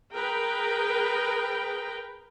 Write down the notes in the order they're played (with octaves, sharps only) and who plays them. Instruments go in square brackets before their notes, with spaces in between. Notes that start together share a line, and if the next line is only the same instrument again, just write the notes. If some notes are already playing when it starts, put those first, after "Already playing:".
[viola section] G#4 A#4 B4 G5